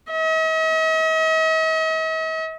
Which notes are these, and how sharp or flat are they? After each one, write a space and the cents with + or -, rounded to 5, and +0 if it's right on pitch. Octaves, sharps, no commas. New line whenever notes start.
D#5 +45